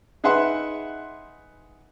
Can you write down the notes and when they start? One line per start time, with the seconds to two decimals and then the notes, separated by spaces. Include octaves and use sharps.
0.24 D#4 G#4 B4 E5 F#5 C6